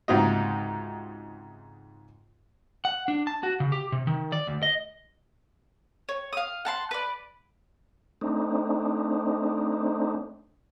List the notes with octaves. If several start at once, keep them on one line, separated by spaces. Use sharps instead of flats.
C#2 G#2 C3 D#4 F#4 D#5
F#5
D4
A5
F#4
C#3
G4
C3
D#3
D5
D2
D#5
C#5
F5 D#6
F#5 A5 C6
B4 D5
A3 C4 D4 D#4